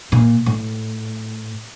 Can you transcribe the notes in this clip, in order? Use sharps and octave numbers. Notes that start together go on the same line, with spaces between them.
A#2
A2